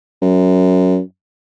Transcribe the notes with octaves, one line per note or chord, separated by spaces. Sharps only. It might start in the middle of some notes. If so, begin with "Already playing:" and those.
F#2